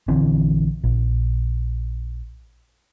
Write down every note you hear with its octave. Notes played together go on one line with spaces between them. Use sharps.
A#1 D3 E3 C4
A#1